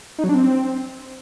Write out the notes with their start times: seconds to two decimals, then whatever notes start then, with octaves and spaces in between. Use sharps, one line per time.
0.19 D#4
0.24 F#3
0.29 D4
0.35 C4